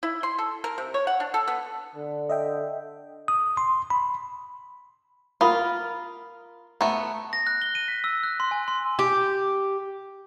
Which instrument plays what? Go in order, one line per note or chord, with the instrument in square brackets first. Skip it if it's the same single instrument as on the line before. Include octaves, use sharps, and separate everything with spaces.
[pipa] E4
C6
A4
A#4
C3
C#5
F#5
D4
A4
B3
[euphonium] D3
[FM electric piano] D#5 E5 G5
[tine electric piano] D#6
C6
B5
[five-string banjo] F4 [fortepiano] A#4 B5 D#6
[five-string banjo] A3 B3 [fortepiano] A#5
[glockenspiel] A#6
F#6
G7
D#7
B6
E6
F#6
C6
G#5
C6
[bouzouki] G4